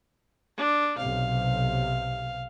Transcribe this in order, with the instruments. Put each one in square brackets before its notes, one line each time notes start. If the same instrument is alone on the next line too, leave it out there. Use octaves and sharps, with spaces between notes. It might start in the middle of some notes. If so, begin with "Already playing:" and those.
[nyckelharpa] D4
[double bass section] B1 C3 [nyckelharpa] F5